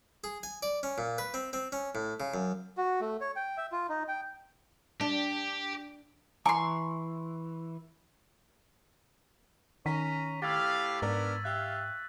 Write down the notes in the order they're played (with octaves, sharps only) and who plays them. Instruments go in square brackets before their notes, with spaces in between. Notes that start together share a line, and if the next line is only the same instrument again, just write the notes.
[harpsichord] G#4
G#5
D5
C#4
A#2
B4
C4
C4
C#4
A2
C#3
F#2
[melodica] F#4
A3
C#5
G5
E5
F4
D#4
G5
[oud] D4 [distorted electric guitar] G4
[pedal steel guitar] E3 [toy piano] G#5 [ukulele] A#5 [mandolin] C6 C#6
[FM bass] D#3 [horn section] C#4 A#5 [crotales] C#6 B6 D#7
[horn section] A2 G4 F5 [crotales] E6 G#6 A6
[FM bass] G#2 [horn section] B3 D4 A#4
[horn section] G4 E5 F5 [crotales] F#6